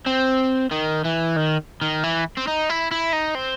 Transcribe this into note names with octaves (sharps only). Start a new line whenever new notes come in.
C4
D#3
E3
D#3
D#3
E3
C4
D#4
E4
E4
D#4
C4